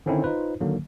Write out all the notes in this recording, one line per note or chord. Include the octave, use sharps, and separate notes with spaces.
D3 D#3 C4 C#4 D#4 E4
D#4 F4 B4 C5
D3 D#3 F#3 A#3